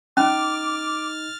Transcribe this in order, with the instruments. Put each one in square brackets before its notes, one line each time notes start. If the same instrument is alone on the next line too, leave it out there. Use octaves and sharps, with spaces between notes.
[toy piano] C#4 [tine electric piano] D#4 [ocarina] D6 [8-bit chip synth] F6 A6